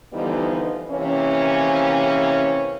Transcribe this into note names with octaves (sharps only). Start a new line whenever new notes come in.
D3 E3 F3 G3 B3 D#4
C3 E3 A#3 C#4